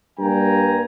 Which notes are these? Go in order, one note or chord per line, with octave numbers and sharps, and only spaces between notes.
G2 G3 A#3 G5 G#5 A#5